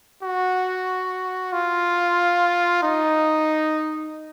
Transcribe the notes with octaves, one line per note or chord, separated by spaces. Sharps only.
F#4
F4
D#4